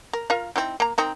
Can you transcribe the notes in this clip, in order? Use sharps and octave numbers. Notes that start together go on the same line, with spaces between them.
A#4
F4 A#4 F5
C4 D#4 E4
A#3 A#5
C4 D#4 A#4